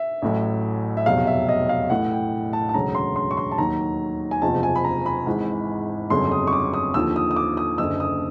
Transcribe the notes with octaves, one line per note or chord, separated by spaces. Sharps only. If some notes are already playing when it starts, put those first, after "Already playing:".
Already playing: E5
A1 A2 F#3
E5
F1 E2 B2 F#3 F5
E5
D#5
F5
A1 A2 E3 F#5
G5
A5
A5
E1 D2 C#3 F#3 A#5
C6
C6
C#6
C6
A5
D#2 D#3 F#3 A#5
G#5
F#1 E2 C3 F3 A5
G#5
B5
A#5
B5
G#1 G#2 E3
G1 F2 C#3 F#3 C6
D#6
C#6
D6
D#6
D#2 D3 F3 E6
D#6
D#6
D6
D#6
F#1 F#2 D3 E6
D#6